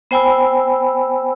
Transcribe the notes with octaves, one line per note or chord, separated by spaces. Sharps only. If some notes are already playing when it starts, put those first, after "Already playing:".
B3 C5 G5 G#5 B5 E6